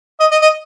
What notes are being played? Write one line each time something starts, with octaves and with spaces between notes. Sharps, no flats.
D#5
D#5
D#5